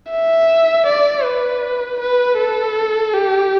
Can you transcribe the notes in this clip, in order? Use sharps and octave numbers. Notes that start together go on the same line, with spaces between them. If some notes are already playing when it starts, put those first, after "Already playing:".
E5
D5
B4
B4
A4
G4